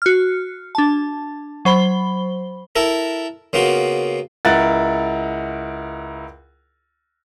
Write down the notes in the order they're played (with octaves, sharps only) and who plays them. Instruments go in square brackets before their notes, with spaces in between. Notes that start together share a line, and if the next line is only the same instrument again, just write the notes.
[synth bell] F#4 F6
D4 A5
F#3 C5 B5 G7
[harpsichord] E4 A4 A#4
C#3 A#3 B3 F4 F#4
[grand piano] C#2 E4 A#4 F#5 F#6 A6